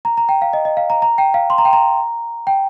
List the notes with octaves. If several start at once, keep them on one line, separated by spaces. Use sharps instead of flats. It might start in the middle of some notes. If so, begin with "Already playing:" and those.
A#5
A#5
G5
F5
D#5
D#5
F5
A#5
A#5
G5
F5
C6
A#5
G5
A#5
G5